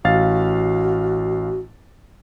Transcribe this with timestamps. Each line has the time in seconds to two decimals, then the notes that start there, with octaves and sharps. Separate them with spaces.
0.04 A1 F#4 F5 A6